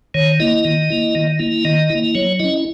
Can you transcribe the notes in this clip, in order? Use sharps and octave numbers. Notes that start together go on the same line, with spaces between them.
D#3 C#5
A#3 E4 D#5
D#3
A#3 E4
D#3
A#3 E4
D#3 D#5
E4
A#3
F#3 C#5
C#4 E4 D#5